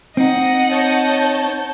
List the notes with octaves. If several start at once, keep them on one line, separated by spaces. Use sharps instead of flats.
C4 D#4 D#5 F#5
C#5 A5 G6